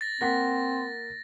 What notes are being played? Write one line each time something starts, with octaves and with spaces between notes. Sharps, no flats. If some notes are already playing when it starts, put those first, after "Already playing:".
A6 A#6
A#3 C4 F#5 A#6 B6